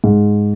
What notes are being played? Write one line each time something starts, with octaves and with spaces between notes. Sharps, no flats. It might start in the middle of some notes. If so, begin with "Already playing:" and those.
G#2